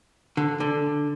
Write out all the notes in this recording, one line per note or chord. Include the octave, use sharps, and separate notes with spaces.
D3
D3